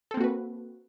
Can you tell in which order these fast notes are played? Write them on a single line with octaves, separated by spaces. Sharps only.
A4 C4 A#3 F#4 B4